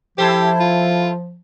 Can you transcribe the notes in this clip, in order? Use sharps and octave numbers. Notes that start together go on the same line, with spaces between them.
F3 E4 G4 A4 C5
F4